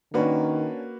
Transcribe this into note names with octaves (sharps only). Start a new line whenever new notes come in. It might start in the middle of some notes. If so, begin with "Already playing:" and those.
D#3 A#3 C#4 D4 F#4 B4